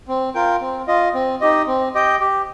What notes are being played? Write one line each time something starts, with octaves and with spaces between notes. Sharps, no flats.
C4
F4 A#4 G5
C4
F4 D#5
C4
D#4 G4 D#5
C4
G4 D#5 G5
G4